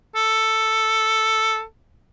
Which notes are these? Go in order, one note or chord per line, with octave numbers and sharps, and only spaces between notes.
A4